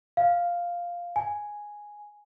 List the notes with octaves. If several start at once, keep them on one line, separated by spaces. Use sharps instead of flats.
F5
G#5